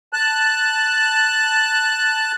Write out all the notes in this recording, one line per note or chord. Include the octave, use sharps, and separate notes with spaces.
A5 F#6